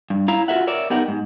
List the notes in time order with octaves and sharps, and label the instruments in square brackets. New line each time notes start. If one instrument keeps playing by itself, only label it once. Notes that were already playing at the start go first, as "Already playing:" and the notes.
[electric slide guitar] G2
E4 F5 A#5
F4 F#4 A4 C#5 E5 F#5
A#4 C#5 D5 E5
B3 D#4 G4 A#4 F#5
G#2